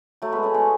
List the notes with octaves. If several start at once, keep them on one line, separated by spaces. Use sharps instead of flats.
F#3 A3
G#3 B3
A3 C#4
G#3 B3